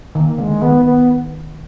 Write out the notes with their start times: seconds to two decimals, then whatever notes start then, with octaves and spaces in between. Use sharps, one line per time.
0.15 D#3 A#3
0.38 D3 G#3
0.62 D#3 B3
0.85 B3